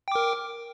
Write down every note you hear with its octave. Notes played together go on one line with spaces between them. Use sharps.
A#4 G5 D6